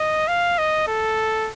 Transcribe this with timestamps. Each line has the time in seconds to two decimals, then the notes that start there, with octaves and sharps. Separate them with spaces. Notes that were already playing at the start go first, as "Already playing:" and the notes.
Already playing: D#5
0.28 F5
0.58 D#5
0.88 A4